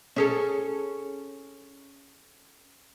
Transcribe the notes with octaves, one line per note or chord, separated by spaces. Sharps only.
C#4 G#4 A4